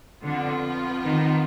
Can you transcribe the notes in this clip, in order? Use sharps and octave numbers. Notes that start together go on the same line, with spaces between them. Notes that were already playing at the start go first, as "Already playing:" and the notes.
F2 D3 F3 B3 F4
D#3